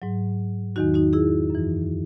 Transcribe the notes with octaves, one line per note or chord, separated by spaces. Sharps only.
G#2 F#3
E2 D#3 F#3 D#4 F#4
D#4 F#4
E4 G#4
F#2 E3